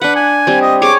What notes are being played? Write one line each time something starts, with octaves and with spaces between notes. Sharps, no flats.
D4 B4 F#5
G#5
G3 C4
D#5
G#4 C#5 D6